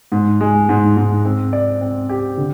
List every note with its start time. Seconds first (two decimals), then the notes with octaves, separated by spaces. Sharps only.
0.12 G#2
0.41 G#3
0.69 G#2
0.97 G#2
1.25 C4
1.53 D5
1.81 C4
2.09 G4
2.37 D3